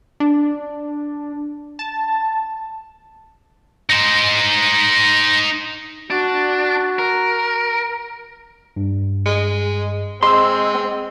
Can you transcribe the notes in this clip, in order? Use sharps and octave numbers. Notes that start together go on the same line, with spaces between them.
D4
A5
D#4 C5
D4 F#4
A#4
G2
G#3
G#3 C4 D#5 C6 E6